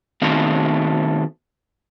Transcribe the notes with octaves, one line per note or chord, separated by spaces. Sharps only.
B2 D#3 A3 C4 F5